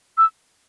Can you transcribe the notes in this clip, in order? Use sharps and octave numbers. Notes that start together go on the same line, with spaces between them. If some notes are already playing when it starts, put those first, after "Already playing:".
E6